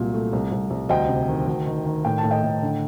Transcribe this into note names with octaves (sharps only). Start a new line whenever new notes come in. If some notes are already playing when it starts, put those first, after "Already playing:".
Already playing: C2 A#2 F#3
A3
C2
C2
C2
D2 D#5 G5
C3
D#3
D2
D#3
D#3
A2 G5
A5
A2
D#5 G5
A2
D3